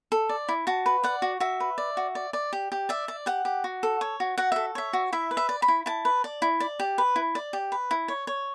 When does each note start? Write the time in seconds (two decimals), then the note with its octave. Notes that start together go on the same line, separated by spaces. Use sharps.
0.12 A4
0.29 D5
0.49 E4
0.67 F#4 A5
0.86 B4
1.04 D5 F#5
1.22 F#4
1.40 F#4 E5
1.60 B4
1.78 D5
1.97 F#4
2.15 D5
2.33 D5
2.53 G4
2.72 G4
2.89 D5 E5
3.08 D5
3.26 G4 F#5
3.45 G4
3.64 F#4
3.83 A4
4.01 C#5
4.20 F#4
4.38 F#4 F#5
4.52 A4 E5
4.75 C#5 E5
4.93 F#4
5.13 E4 E5
5.31 B4
5.37 E5
5.49 D5
5.62 B5
5.68 E4
5.86 E4 A5
6.05 B4
6.24 D5
6.42 E4
6.60 D5
6.80 G4
6.98 B4
7.16 E4
7.35 D5
7.53 G4
7.72 B4
7.91 E4
8.08 C#5
8.27 C#5